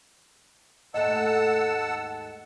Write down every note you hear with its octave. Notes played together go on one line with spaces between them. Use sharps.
D#2 G#2 A3 D#5 F#5 A5 E6